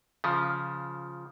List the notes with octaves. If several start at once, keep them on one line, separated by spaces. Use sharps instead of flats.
C#3 F3